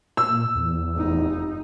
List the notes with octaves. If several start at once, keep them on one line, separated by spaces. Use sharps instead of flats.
A#2 E6
E2
F1 D#4